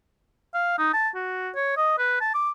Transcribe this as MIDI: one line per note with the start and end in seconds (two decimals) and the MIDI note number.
0.54 0.74 77
0.79 0.91 63
0.94 1.09 81
1.15 1.50 66
1.55 1.74 73
1.77 1.97 75
1.98 2.17 71
2.21 2.30 81
2.34 2.51 86